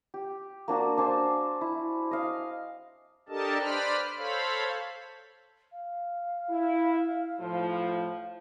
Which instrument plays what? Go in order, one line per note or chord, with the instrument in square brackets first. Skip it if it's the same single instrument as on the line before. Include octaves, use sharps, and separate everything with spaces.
[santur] G4
A#3 D4 F#4
D4 C5 G#5 A5
E4
D#5 F5
[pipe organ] D4 G4 A4 A#4 D#5 A5
B4 C5 D5 B5 F6
A4 C5 C#5 F5 B5
[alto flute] F5
[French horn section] E4
A2 F3